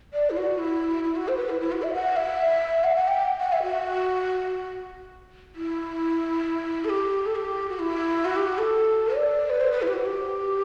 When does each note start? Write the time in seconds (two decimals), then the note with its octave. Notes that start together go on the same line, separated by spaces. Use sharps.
0.14 D5
0.30 E4
0.37 F#4
0.59 E4
1.04 E4
1.16 F#4
1.28 C5
1.37 B4
1.49 E4
1.60 E4
1.72 F#4
1.82 E5
1.94 F#5
2.16 E5
2.84 F#5
2.96 F#5
3.08 G5
3.40 F#5
3.52 E5
3.63 F#4
5.55 E4
6.84 A4
6.89 G4
7.26 A4
7.35 G4
7.70 F#4
7.79 E4
8.25 F#4
8.36 G4
8.47 F#4
8.59 A4
9.15 D5
9.50 B4
9.60 C5
9.71 B4
9.82 E4
9.88 G4
9.93 F#4
10.06 G4